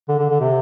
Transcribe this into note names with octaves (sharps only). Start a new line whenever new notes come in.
D3
D3
D3
C3